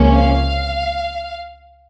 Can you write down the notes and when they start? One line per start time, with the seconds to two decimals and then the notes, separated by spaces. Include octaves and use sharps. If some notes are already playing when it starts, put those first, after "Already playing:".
Already playing: C#2 C3 F3 A#3 C#4
0.14 F5